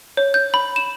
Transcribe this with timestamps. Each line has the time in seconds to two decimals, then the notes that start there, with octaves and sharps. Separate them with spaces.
0.17 C#5
0.34 G6
0.54 B5
0.76 E7